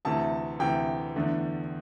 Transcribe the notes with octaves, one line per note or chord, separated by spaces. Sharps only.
D2 C3 E3 A3 A5
D2 C3 E3 A3 G5
E2 D3 A3